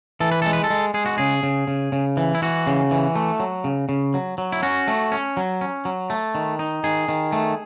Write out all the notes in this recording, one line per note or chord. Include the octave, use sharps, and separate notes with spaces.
E3 A4
B4
G#3 A4
B4
A4
G#3
G#3 G#4
F#4
C#3 G#4
C#3
C#3
C#3
E3
E4
E3 F#4
C#3
E3
A3
F#3
C#3
C#3
F#3
F#3
E4
C#4 F#4
A3
C#4
F#3
C#4
F#3
A3
D#3
D#4
D#3 G#4
D#3
A3